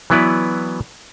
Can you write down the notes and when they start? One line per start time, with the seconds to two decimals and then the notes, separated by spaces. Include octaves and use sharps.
0.10 E3 F#3 B3 E4 B4 D5